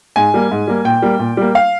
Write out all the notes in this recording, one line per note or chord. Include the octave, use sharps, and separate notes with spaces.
G#2 G#5
G3 A#3
G#2
G3 A#3
A#2 G5
G3 A#3
A#2
G3 A#3
F5